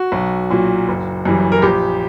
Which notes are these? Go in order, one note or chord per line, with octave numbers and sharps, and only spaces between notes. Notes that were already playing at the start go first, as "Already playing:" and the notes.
Already playing: F#4
B1
A#2 F#3
F#1
F#2 E3 G3
A#4
A#1 G4